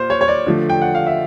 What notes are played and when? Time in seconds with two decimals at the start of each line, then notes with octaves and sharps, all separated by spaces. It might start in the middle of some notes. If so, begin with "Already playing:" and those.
Already playing: A#2 C5
0.10 C#5
0.21 C#5
0.28 D5
0.46 D3 F3 A3
0.70 G5
0.82 F#5
0.95 F5
1.07 E5